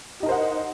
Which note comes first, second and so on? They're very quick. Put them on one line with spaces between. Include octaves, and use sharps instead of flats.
G4 D#4 A#4 C5 F#5